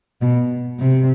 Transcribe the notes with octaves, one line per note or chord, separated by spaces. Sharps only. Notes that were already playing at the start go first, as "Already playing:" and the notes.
B2
C3